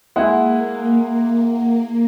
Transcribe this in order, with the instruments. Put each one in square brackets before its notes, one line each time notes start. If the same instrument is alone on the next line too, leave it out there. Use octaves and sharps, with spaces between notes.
[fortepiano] G#3 E4 G#4 [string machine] A#3 [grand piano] F#5